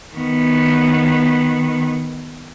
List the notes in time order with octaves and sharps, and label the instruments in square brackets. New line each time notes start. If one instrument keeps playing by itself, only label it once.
[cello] D#3 B3